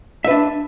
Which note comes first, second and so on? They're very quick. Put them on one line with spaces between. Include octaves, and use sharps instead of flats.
E5 B4 D4